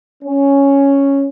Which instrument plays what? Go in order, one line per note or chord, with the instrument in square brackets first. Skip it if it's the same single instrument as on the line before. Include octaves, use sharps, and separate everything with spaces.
[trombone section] C#4